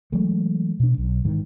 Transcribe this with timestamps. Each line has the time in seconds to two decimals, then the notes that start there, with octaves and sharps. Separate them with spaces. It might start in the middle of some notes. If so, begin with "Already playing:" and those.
0.12 E3 F#3 G#3 A3
0.80 B2 D4
0.98 B1
1.25 G#2 D#3 E3